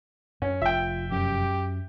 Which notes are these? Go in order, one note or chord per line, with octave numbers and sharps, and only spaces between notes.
F#2 C#4
F1 F4 E5 G5
F#2 G4